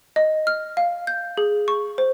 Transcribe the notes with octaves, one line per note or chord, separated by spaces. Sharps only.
D#5
F6
F5
G6
G#4
C#6
C5